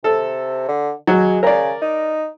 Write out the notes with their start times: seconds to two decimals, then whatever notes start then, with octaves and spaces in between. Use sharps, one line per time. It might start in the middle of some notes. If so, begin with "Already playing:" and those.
0.04 C3 A4
0.68 D3
1.07 F#3 G#3
1.43 C#3 A#4 D5
1.81 D#4